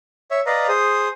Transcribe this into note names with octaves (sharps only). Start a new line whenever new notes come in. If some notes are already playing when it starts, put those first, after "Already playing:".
C#5 E5
B4 D5 D#5 F5 A#5
G#4 C5 D#6